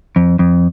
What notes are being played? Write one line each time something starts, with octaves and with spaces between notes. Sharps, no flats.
F2
F2